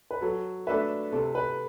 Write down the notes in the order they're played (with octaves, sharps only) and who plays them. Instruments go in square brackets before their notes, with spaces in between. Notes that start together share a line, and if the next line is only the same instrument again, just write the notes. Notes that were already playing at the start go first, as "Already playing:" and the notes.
[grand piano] B4
[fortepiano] F#3 [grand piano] A4
[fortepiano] A3 D4 A4 E5 [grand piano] B4
[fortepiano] C3 [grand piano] A4
[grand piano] B4